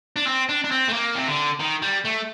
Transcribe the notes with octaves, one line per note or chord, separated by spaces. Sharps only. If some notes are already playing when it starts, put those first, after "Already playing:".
D4
C4
D4
D4
C4
A3
A#3
C3
D3
D#3
G3
A3